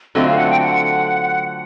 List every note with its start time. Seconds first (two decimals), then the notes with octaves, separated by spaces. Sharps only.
0.15 D3 F#3 A3 C4 F4 D#5
0.27 F5
0.38 F#5
0.49 G5
0.61 F#5